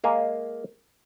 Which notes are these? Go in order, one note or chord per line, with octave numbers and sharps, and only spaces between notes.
G#3 A#3 F5 G#5